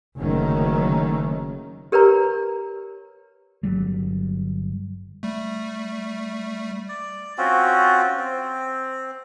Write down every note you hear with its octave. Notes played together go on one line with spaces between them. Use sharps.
F#1 D3 D#3 F#3 A3 C#4
G4 A#4 B4 C#5 A#5
G1 F#3 G3
G3 A3
D5
C4 C#4 F4 F#4
C4